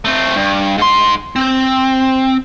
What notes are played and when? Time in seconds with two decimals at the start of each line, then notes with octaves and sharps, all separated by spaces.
0.05 A3 C4
0.36 G2
0.78 G#2 C6
1.36 C4